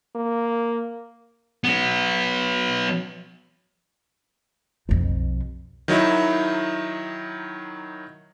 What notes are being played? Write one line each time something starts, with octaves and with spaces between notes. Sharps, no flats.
A#3
F#3 B3
B1 F2
D#3 F#3 D#4 E4